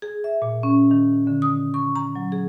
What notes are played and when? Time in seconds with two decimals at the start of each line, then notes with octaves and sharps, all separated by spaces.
0.02 G#4
0.24 E5
0.42 A#2
0.63 C#4
0.91 D#3
1.27 D3
1.42 D#6
1.74 C#6
1.96 A#5
2.15 F#3
2.32 G#4